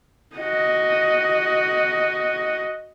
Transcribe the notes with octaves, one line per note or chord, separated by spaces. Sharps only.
F#4 D#5